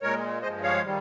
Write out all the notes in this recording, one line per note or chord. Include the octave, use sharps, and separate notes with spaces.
A#2 G#3 A#4 C#5
G2 F3 G#3 C5 D#5
C#5 F5
D#3 G3